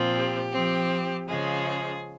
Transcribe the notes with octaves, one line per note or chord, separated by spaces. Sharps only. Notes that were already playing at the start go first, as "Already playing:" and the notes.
Already playing: A#2 F3 C4
G4
F3 C4
C#3 F3 G#3 G#4